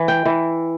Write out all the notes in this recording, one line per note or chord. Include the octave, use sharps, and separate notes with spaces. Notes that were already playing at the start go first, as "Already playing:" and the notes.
Already playing: E3
G5
E3